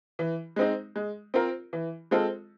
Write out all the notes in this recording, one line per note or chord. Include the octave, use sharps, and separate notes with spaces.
E3
G#3 C4 D#4
G#3
C4 F4 A#4
E3
G#3 C4 F4 A4